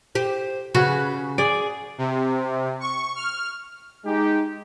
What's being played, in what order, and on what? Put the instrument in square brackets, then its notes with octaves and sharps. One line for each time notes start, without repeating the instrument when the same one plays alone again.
[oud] G4 [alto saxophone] C5
[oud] C#3 [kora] F#4 [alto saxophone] B4
[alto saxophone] G#4 [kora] D5
[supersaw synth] C3
C#6
F6
[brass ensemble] G#3 D#4 G4